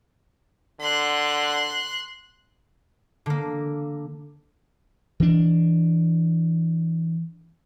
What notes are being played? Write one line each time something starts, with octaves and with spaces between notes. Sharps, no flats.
D3 C6 F#6
D3 A#3
E3 D4